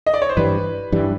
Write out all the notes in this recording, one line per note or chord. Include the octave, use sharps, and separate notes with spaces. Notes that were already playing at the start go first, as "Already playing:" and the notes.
D#5
D5
C#5
C5
G2 E3 G3 B4
G2 E3 G3